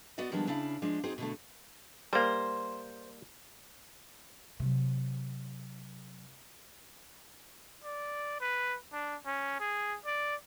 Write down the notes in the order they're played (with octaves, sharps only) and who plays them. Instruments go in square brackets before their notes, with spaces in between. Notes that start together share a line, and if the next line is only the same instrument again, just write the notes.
[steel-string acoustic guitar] B3 F#4 D5 D#5
D#3 F3 G3 G#3 B3 D4
C#3 D4 E4 F5
F3 G#3 D4
C4 D#4 F#4 G#4 C5
B2 D3 A3
[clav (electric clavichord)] G3 A#3 [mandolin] C5
[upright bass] C3 F#3
[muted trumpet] D5
B4
D4
C#4
G#4
D5